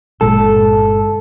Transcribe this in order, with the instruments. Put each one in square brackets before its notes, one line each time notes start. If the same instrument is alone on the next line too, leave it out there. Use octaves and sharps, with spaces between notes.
[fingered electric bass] G1 A#2 G#3 [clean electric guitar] A4